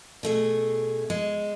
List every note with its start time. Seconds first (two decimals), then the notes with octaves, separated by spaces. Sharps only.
0.23 B2 A3 G#4
1.10 G#3